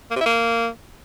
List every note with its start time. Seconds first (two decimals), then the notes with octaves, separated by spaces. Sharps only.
0.11 A#3
0.16 C3
0.21 E4
0.26 A#3